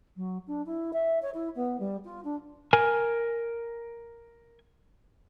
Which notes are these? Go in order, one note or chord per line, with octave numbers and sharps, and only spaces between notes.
F#3
D4
E4
E5
C#5
E4
B3
G3
F4
D4
A#4 G#5